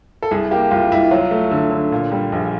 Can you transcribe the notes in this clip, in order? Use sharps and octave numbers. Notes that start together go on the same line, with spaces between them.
A4
C2 G#4
A#3 G4
C2 F4
C2 E4
F#3 F4
A3
D3
D3
A#2
G3
A#1